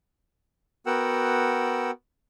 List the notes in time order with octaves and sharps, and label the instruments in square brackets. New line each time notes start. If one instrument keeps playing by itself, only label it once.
[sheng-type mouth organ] B3 F#4 A#4 F#5 G5 E6